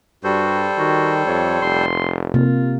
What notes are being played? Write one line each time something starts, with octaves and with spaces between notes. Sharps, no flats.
G2 G3 F#4 A4 C5
D#3 F#4
F2 C#5
F1 C6
C3 A#3 F4